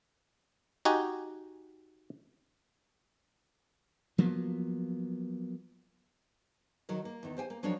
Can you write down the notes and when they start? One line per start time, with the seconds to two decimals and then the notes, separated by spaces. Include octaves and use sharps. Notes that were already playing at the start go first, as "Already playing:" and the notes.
0.85 D#4 F#4 G4 G#5
4.18 F3 F#3 A#3 B3
6.89 D#3 F#3 A#4 D#5
7.05 A#3
7.23 E2 D#3
7.37 G4 C5 G5 G#5
7.50 A#3
7.63 F3 F#3 C#4 D4 A#4 C#5